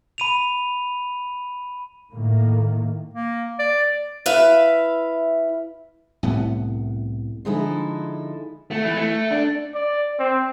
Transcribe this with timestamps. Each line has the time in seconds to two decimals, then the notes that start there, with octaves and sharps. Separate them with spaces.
0.18 B5 D#7 F7
2.10 A2 D#3 A#3
3.14 A#3
3.59 D5
4.26 E4 B4 E5 F5
6.23 C2 A2 B3
7.45 D3 F3 G#3 D#4 E4 A4
8.71 A3
8.84 E3
8.97 A3
9.31 D4
9.75 D5
10.20 C4